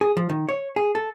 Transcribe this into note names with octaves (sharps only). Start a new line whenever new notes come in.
G#4
F3
D#3
C#5
G#4
A4